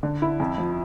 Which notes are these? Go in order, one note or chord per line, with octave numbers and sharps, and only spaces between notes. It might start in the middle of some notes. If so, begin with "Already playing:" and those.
D3
E4
F2
F3